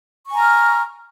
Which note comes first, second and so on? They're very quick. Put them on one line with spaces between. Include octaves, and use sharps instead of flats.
C#6 G#5 A#5 F6